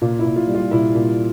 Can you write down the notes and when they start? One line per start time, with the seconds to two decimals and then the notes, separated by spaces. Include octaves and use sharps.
0.02 A#2 F4
0.19 E4
0.25 A#2
0.36 F4
0.47 G3
0.54 F4
0.71 A#2 E4
0.95 A#2